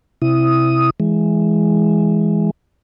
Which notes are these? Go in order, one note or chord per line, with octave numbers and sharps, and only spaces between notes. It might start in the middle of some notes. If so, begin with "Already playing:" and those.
C3 E4 D#6
E3 G#3